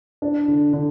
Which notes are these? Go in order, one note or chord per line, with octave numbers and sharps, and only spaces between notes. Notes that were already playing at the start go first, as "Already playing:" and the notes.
D4
D3
D3